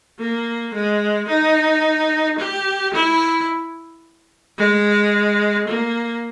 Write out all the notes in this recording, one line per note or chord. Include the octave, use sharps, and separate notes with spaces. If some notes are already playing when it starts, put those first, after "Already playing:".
A#3
G#3
D#4
G4
E4
G#3
A#3